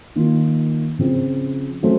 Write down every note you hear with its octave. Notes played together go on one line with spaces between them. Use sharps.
D#3 A#3 F4
C#3 F3 C4
F#3 A3 C#4 A4 C5